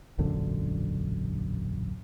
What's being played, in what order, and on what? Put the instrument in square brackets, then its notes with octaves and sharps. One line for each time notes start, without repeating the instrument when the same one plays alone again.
[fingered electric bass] E1 A#1 F#2 D3